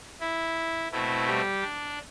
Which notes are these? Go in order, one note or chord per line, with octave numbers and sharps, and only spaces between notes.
E4
B2 A3 C4 E4
G3 G4
D4